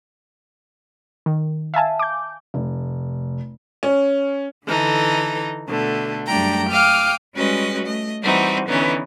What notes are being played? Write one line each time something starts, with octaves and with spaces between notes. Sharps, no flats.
D#3
E5 F5 G#5 A5
D6 G6
F1
C#4
D3 E3 D#4 A4
B2 D3 A3
F#2 G3 A3 D4 G5 A#5
F5 G5 D6 D#6 F6
G3 G#3 C#4 F#4 B4 D#5
A3 D#5
E3 G3 C4 D#4 F#4
D3 E3 B3 C#4 D#4